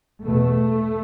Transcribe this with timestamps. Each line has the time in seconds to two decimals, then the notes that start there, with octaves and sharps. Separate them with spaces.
0.24 E2 B2 A3